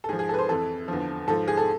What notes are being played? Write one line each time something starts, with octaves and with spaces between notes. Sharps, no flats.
A4
G#2 F3 G#4
G#4
A4
B4
C5
F2 E3 A4
E2 D3 F3
G#2 F3 A4
G#4
A4